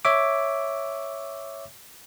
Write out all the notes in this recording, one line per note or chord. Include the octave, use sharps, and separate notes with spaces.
C#5 E5 D6